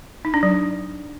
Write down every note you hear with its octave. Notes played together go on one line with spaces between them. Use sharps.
D#4
D4
F#3